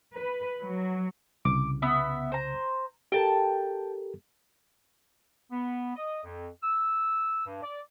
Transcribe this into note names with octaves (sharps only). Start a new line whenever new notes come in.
B4
F#3
C2 C#3 D6
B3 E5
C5 A#5
G4 A4 A#4 G5 A5
B3
D#5
F2
E6
G2
D5